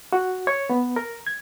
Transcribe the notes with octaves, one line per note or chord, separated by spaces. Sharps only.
F#4
C#5
B3
A#4
G#6